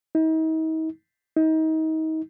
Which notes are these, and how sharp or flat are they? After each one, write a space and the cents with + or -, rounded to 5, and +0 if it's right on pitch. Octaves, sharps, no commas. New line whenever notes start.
D#4 +40
D#4 +30